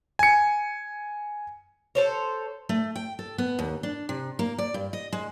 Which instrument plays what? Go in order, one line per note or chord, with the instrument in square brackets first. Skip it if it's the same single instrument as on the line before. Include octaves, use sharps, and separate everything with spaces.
[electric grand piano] G#5 C#7
[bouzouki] A4 C5 C#5
[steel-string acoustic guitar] A3
G5
A4
B3
D#2
D4
C3
A#3
D5
G2
D#5
G#3